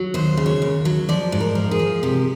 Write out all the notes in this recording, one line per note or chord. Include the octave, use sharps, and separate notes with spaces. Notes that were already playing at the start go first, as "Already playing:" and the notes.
Already playing: F#3
D#2 C5
C#3
C#5
D#2
F#3
F3 D5
G#2
A#4
F3
G#4
F3
C3 G4